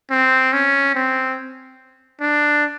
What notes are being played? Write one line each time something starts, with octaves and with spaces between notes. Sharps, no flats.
C4
C#4
C4
D4